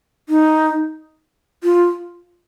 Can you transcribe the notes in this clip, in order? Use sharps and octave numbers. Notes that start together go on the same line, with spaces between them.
D#4
F4